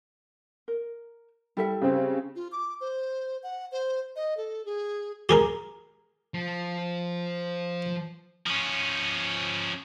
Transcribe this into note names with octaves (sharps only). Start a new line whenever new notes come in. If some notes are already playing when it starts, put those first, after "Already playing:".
A#4
G3 E4 A4 E5
C#3 C4
F4
D6
C5
F#5
C5
D#5
A4
G#4
G4 G#4 A#4
F3
F3 C#4